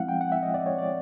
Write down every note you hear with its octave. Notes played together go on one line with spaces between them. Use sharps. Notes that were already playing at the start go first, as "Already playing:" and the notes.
Already playing: F3 G#3 C4 E4 F5 F#5
G5
F#5
E5
D#5
D5
C#5
D5